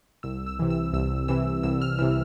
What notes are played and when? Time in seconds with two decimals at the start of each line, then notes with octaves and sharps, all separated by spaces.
0.23 C2 E6
0.46 E6
0.59 C3 E3
0.70 E6
0.93 C2 E6
1.28 C3 E3 E6
1.63 C2 E6
1.82 F6
1.99 C3 E3 E6